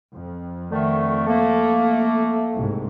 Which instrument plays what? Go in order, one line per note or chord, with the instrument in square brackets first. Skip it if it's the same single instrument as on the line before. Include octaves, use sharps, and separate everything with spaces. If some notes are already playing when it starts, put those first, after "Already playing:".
[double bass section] F2
[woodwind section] D3 D#3 A3
A3 A#3
[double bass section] C2 G#2